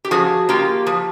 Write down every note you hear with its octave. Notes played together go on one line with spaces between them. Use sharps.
G4
F3 F#4 G#4
A#3 F4 G4
F3